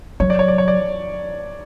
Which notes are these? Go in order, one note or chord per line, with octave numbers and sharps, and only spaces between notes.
F#3 C#5
D5
C#5
D5
C#5
D5